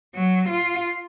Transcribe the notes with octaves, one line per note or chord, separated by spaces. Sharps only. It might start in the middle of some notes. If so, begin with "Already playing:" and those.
F#3
F4